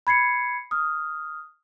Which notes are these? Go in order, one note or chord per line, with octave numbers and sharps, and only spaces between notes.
B5 G#6 C7 C#7
D#6 F6